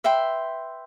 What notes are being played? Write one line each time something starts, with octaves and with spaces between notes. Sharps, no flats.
B4 E5 G5 C6